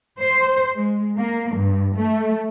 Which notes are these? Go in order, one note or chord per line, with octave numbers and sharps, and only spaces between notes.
C5
G#3
A#3
G2
A3